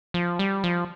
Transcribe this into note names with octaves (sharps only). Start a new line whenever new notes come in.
F3
G3
F3